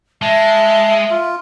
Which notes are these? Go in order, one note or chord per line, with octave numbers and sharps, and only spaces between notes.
G#3 E5 A5
F4